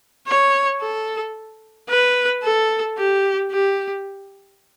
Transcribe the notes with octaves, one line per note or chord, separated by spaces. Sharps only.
C#5
A4
B4
A4
G4
G4